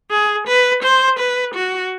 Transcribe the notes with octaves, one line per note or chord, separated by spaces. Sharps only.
G#4
B4
C5
B4
F#4